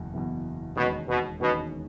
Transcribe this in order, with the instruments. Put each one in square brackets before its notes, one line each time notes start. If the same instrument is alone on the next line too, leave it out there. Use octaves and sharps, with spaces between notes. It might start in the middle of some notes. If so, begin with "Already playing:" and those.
Already playing: [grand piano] F#1 E2 B2
F#1 E2 B2
[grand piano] E1 D#2 D#3 G#3 C#4 [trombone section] B2
[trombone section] B2
[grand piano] E1 D#2 D#3 G#3 C#4 [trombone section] B2